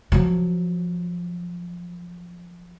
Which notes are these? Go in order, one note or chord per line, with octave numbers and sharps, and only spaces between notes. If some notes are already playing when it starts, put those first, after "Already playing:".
F3 F#3